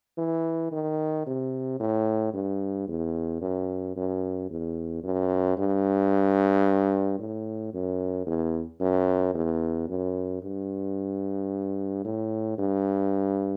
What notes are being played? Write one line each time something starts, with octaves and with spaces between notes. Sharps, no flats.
E3
D#3
C3
A2
G2
E2
F#2
F#2
E2
F#2
G2
A2
F#2
E2
F#2
E2
F#2
G2
A2
G2